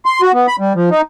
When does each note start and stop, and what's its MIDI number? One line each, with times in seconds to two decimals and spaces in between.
0.05 0.21 84
0.22 0.32 66
0.34 0.47 59
0.48 0.56 83
0.59 0.73 55
0.75 0.90 53
0.91 1.02 63